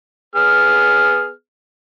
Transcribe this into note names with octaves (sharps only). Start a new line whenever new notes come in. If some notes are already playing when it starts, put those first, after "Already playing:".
B3 G#4 F6